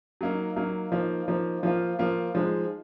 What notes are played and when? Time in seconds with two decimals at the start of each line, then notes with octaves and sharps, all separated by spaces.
0.21 F#3 A#3 D#4
0.56 F#3 A#3 D#4
0.92 F3 A#3 D#4
1.28 F3 A#3 D#4
1.63 F3 A#3 F4
1.99 F3 A#3 F4
2.35 F3 G#3 D#4